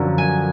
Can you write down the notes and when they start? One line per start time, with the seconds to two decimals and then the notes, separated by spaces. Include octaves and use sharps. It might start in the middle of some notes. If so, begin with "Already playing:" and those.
Already playing: F#2 D3 F3 A#3
0.18 G#5